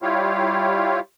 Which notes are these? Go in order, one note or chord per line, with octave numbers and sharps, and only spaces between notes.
G3 E4 F4 G4 C#5 F5